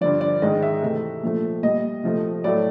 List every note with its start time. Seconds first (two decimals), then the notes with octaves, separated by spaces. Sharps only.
0.01 G2 D3 F3 D5
0.21 D5
0.42 G#2 D#3 G#3 D#5
0.63 E5
0.82 C3 E3 A3
1.23 A#2 F3 A3
1.63 A#2 G3 D#5
2.04 C3 F3 A3
2.44 A2 F#3 A3 D5